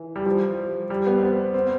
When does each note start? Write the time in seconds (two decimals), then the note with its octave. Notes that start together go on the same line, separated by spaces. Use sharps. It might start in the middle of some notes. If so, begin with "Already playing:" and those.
Already playing: E3
0.16 G3
0.26 F3
0.90 G3
1.06 B3
1.18 C4
1.23 B3
1.54 C4